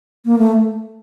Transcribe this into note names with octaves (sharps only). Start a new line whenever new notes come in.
A#3
A3